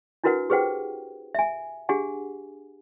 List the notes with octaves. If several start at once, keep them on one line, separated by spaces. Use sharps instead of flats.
D4 E4 F#4 A#4 B4 F#5
G4 G#4 B4 C5 F#5 G5
E5 G#5
D4 G4 G#4 F#5 G#5